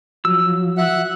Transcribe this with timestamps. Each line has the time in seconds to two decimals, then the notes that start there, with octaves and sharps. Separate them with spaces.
0.25 F3 F#3 E6
0.78 E5 F#5 F#6